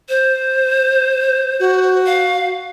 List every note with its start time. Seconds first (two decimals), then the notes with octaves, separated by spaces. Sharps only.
0.09 C5
1.60 F#4
2.06 F5